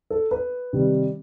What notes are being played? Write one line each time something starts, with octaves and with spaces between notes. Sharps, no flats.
A4
B4
C3 D#3 G3 C4